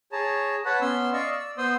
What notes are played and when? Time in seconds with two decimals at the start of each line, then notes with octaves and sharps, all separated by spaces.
0.12 G#4 C#5 A5 A#5
0.66 B4 C#5 F#5 A5 B5
0.81 B3 C#4 C6 E6
1.13 D5 D#5 F5 C#6 E6
1.31 D5 E6
1.58 B3 C5 C6 D#6 E6